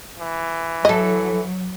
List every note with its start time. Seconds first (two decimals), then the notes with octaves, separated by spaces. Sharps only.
0.20 E3
0.85 F#3 E4 A4 D#5